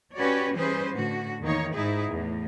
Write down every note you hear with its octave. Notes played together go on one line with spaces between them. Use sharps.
C#4 F#4 G4 B4 C#5 D5
E3 G3 C#4 G#4 B4 C5
A2 D3 F#4
E2 D#3 A#3 D#4 C#5
G#2 D#4 E4 G#4
E2 A2